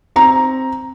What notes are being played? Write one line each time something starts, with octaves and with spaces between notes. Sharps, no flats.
C4 A#5